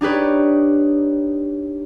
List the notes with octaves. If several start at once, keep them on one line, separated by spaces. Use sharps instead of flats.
D4 D#4 G4 B4 C#5